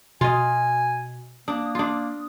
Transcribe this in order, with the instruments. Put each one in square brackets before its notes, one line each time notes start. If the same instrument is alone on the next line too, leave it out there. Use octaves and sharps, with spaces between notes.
[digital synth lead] B2 [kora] F4 D#5 [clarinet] G#5
[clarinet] A#3 [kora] D4 [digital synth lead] D#6
[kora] D4 F4